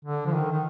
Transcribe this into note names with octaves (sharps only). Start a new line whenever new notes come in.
D3
F3
D#3
D#3